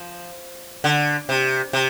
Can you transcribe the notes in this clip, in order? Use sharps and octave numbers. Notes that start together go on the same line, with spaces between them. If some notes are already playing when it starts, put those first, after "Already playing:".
Already playing: F3
D3
C3
C3